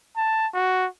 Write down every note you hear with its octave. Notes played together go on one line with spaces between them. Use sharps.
A5
F#4